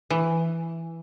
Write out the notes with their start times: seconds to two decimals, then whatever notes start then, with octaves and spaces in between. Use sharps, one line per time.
0.10 E3